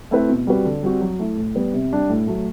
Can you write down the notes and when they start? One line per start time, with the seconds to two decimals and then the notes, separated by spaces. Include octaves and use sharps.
0.11 A3 C4 E4 B4
0.29 B2
0.47 G3 C4 F#4 B4
0.65 D3
0.83 G3 C4 F#4
1.01 F#3
1.19 A3 E4
1.37 A2
1.55 G3 B3
1.74 C3
1.92 G3 D4 G4
2.10 A2
2.27 F#3 A3